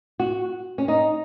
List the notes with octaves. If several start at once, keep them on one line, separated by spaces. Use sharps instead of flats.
F#4
C#4
D#4